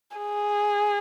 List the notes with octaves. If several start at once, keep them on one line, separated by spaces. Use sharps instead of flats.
G#4